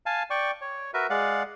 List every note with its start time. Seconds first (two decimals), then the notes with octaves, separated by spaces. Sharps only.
0.06 F5 G#5 A5
0.30 D5 G5 C#6
0.61 C#5
0.94 F#4 A#4 B4 E5
1.10 G#3 D5 F5 F#5